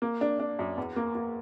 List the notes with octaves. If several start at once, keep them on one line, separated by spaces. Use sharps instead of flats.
A#3
D4
D4
F#2
E2
A#3
A#3